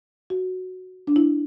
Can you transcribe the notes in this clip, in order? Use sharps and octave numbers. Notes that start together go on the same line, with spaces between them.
F#4
D4
E4